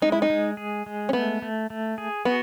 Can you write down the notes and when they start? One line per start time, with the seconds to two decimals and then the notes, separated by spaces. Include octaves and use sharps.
0.02 G#3 D#4
0.12 E4
0.22 D#4
0.30 G#3
0.57 G#4
0.86 G#3
1.09 C#4
1.13 A3 B3
1.42 A3
1.70 A3
1.98 G#4
2.25 B3 F#4